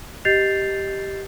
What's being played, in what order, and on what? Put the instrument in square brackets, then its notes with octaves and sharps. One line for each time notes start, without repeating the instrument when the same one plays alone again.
[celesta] G4 D#5 G6 A6 C7 F7